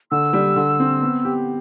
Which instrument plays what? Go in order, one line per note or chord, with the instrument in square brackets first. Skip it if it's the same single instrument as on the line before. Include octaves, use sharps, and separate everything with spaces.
[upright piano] D3 [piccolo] E6
[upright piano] G3
D3
C4
B3
G4